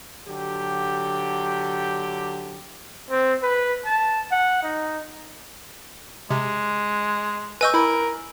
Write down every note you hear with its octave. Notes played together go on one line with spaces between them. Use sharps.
D3 F#3 G4
C4
B4
A5
F#5
D#4
C3 G#3
B4 D#5 G#5 C#6 E6 G6
E4 A#4 B5